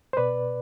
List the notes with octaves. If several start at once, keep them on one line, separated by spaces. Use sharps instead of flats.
C5
B2 B4 D5